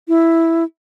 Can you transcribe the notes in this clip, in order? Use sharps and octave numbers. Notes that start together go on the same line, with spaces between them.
E4